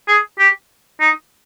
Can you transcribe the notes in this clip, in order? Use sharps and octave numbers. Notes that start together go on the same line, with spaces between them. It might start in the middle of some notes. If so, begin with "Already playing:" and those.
G#4
G4
D#4